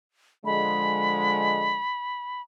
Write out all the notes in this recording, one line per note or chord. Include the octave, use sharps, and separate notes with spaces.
D3 F3 G#3 B5